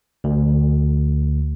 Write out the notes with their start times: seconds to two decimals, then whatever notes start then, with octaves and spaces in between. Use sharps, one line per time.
0.24 D2